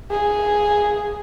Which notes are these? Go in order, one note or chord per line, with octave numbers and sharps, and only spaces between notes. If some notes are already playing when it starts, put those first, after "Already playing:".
G#4